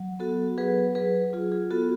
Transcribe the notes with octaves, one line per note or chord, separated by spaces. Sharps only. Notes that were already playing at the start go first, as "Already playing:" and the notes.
Already playing: F#3
B3 F#4 A4
F#3 G#4 B4
F#3 G#4 B4
F4 G#4
G#4
B3 F#4 A4